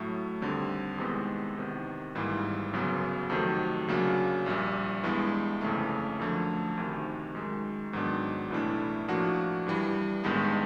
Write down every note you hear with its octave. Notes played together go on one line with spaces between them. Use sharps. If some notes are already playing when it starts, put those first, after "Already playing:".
Already playing: A2 F#3 A3
D#2 D3 G3 C4
E2 C3 D#3 G#3 B3
E2 C3 D#3
G#1 G#2 E3 G3 A#3
G1 F#2 C#3 F#3 B3
F2 C3 D#3 F#3 A3
D2 C#3 F#3 A#3 D4
A#1 A#2 G3
G2 E3 G#3 B3
G1 F2 C#3 E3 A3
F#2 D3 F3 A3 D4
D2 C3 D#3
F#2 D#3 G#3
G#2 D#3 F#3 B3 D4
B1 A2 E3 A3 D4
A2 F3 A#3 D4 F#4
G2 E3 G3
A1 G2 D#3 G#3 B3